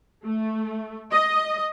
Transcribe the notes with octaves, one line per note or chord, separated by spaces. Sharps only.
A3
D#5